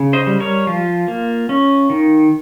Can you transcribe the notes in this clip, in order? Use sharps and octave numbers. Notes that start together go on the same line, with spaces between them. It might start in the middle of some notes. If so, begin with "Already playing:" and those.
Already playing: C#3
C5 D#5
G3
A#4 C#5
F3 F4
A#3
C#4
D#3